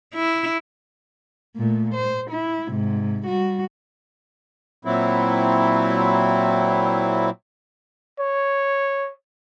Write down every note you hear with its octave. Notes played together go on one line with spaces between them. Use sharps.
E4
A#2 A3
C5
E4
G#2 C3
G3 F#4
A#2 F#3 C4 E4
C#5